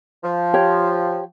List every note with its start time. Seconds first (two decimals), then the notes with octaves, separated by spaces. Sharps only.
0.24 F3
0.54 G4 C#5 G5